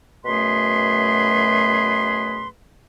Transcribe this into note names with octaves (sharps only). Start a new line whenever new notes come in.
F#2 B2 A3 G#4 B4 C6